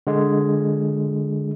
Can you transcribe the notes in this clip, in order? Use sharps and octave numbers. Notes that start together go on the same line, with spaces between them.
D3 G#3